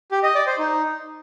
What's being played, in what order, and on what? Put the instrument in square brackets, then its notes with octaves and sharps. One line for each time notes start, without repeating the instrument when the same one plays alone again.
[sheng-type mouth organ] G4
D#5
D5
C5
D#4